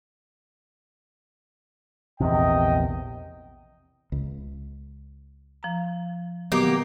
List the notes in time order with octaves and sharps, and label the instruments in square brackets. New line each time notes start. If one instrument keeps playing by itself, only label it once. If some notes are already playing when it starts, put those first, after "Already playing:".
[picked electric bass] A#1 E2 C3 [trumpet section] D#5 G5
[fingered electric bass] C#2
[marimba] F3 A#5
[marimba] B2 D#3 [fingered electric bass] F#3 [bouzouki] A#3 G4 [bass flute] B3